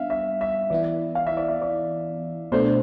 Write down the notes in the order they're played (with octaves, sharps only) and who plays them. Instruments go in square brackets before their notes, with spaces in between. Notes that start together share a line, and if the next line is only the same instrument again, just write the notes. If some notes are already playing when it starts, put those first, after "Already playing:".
Already playing: [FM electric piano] G3 B3 D4 [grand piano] E5 F5
[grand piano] E5
E5
[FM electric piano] E3 B3 E4 [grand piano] D5
[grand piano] F5
E5
D5
E5
D5
[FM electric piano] B2 A3 D4 [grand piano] C5